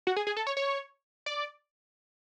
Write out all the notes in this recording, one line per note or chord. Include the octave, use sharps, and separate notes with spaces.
F#4
G#4
G#4
A4
C#5
C#5
D5